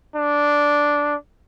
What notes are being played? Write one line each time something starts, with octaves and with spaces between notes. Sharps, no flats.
D4